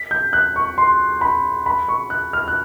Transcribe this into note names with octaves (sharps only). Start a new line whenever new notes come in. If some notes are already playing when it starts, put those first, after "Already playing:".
Already playing: B6
G6
F#6
C#6
C6
B5
B5
C#6
F#6
F6
F#6